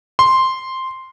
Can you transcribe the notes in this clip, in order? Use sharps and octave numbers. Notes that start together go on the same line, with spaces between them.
C6